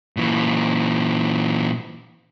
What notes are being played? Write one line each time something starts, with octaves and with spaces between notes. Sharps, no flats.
A#2 E3